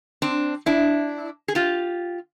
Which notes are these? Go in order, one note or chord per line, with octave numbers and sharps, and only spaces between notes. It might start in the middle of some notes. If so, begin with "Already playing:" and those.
C4 D4
D4 E4
G#4
F4 G4